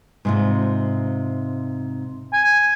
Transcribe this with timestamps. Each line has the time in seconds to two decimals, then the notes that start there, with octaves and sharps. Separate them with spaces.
0.25 G#2 C3 F4
2.33 G#5